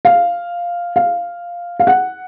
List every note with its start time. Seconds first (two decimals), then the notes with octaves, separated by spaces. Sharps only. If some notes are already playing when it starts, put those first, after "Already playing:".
0.05 F5
0.96 F5
1.80 F5
1.87 F#5